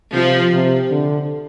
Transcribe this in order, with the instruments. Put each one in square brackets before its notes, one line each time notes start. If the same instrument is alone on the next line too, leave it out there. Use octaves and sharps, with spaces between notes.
[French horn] C3 [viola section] F3
[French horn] C3
D3